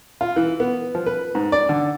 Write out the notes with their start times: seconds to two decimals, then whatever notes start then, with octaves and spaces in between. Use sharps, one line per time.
0.21 F4
0.36 E3
0.60 B3
0.95 F3
1.06 B4
1.35 G#2
1.52 D5
1.69 D3